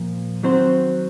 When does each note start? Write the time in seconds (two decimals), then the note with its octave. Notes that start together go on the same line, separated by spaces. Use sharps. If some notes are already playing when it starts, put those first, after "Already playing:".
Already playing: A#2 F3 A#3
0.43 D#3 F#3 C4 F#4 C5